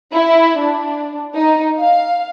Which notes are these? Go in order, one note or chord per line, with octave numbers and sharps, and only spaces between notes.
E4
D4
D#4
F5